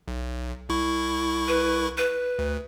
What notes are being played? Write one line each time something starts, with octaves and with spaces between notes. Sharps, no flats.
B1
C2 E4 C#6
B4
B4
D2